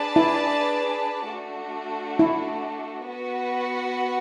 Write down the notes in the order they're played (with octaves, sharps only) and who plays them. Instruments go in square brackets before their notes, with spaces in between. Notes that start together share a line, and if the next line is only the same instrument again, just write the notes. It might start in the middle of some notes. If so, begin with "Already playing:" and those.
Already playing: [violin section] D4 G#4 B4 D5 A5
[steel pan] E4
[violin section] A3 D4 F#4
[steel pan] E4
[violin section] B3 F#4 B4 F#5